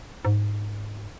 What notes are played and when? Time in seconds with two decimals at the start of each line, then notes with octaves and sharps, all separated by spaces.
0.25 G#2